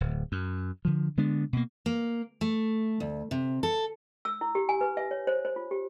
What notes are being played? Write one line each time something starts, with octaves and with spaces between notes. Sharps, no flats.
D1
F#2
D3 F3
D3 G#3 B3 D4
B2 A#3
A#3
A3
D2
C3
A4
E6
E4
G4
G#5
B4
E5
C#5
C5
C5
F4
G4